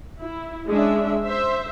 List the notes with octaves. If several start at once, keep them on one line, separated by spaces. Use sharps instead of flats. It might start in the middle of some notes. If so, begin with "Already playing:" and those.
E4
G#3 C#4 D4 E5
C5 E5